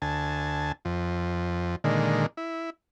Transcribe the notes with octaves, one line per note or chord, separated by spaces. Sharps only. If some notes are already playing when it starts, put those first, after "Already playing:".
D2 G#5 A5
F2
A#2 D3 D#3 G#3
E4